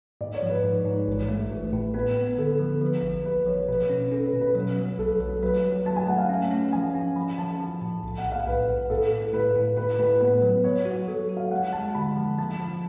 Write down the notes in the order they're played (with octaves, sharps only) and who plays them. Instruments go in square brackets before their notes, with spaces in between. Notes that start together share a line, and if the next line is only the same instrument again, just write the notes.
[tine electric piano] G#2 [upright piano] D5
[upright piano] C#5
[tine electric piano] F3
[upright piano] B4
[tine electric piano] G#2
G#2
A1
A3
A1
A2
[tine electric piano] B3 [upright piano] B4
[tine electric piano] B3
[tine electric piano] D3 [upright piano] A4
[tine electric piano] F3
[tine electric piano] F3 [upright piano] B4
[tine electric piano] A1
[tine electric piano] A1 [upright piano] B4
[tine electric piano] F3 [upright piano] C#5
[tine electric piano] B2 [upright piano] B4
[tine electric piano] C#4
[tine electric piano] C#4 [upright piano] A4
[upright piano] B4
[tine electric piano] B2
[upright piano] B4
[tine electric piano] F#3 [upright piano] B4
[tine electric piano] F#3
[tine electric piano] B1 [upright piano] A4
[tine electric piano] F#3
[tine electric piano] F#3 [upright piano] B4
[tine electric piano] F#3
[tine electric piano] F#3 [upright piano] A5
[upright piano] G#5
[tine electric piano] A3 [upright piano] F#5
[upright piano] F5
[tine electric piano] C#4
C#4
[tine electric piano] F3 [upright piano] G#5
[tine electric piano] C#4
[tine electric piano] F3 [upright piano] B5
[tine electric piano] F3 [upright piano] A5
[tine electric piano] F3
A2
B1
[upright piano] F#5
[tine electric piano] A2
[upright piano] F5
[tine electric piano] B1 [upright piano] B4
[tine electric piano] A2
[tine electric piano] A2 [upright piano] A4
[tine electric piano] A2
[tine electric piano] A2 [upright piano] B4
[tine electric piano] A2
[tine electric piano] A2 [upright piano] B4
[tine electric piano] A2 [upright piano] B4
[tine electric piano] B3 [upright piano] B4
[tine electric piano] F#3
[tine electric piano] F#3 [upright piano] C#5
[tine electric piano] F#4
[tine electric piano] F#3 [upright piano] A4
[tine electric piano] F#4
[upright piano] F5
[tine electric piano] G#3 [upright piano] F#5
[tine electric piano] G#3 [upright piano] A5
[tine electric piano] D3 [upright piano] B5
[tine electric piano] F3
[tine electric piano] F3 [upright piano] A5
[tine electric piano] F3